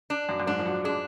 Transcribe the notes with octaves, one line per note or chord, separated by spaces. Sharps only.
D4
F#2
F#2
G#2 D4
F3
F#3
G#3 D4